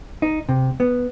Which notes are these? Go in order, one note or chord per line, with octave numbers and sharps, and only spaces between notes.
D#4
C3
B3